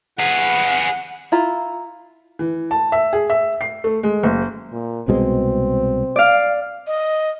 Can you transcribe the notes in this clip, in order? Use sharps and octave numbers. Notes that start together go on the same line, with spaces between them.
G#4 B4 F#5
E4 F4 A#5
E3
A5
E5
G#4
E5
C7
A3
G#3
F#1
A#2
C2 B2 G#3 C4
D5 F5
D#5